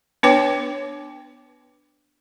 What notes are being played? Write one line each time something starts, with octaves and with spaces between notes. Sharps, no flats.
B3 D4 B4 C#5 G5 D6